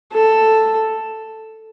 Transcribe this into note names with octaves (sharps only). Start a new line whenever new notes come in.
A4